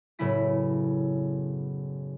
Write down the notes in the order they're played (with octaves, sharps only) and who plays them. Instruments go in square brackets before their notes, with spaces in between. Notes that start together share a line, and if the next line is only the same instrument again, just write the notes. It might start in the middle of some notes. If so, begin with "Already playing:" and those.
[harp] F#1 A2 C#3 B3 E4 B6